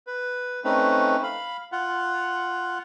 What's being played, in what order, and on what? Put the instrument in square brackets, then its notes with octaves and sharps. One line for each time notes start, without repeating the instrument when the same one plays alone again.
[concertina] B4
A3 C4 C#4 D#4 B4
F5 B5
F4 F#5